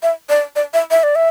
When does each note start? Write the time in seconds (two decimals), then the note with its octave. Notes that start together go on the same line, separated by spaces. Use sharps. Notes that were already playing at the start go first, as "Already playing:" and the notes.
0.03 E5
0.29 D5
0.56 D5
0.74 E5
0.91 E5
1.03 D5
1.15 E5